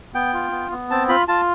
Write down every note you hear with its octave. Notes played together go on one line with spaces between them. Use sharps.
B3 G5
F4
B3
B3
C4 A5
F4 B5
F4 A5